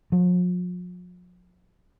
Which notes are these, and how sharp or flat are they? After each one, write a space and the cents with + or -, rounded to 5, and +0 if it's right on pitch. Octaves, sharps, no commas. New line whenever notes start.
F3 +45